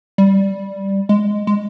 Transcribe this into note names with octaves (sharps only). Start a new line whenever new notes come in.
G3
G#3
G#3